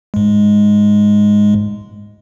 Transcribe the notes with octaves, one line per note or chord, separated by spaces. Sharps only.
G#2 G#3